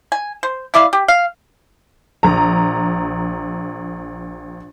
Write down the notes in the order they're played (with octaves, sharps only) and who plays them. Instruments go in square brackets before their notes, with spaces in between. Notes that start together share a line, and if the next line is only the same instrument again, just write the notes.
[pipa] G#5
C5
E4 D5 E5 F5
G4
F5
[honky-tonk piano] A#1 A#5